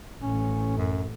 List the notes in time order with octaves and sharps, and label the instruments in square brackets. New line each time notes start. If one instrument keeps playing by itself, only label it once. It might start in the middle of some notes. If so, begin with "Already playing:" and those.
[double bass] A1 [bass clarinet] C#4
[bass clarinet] F#2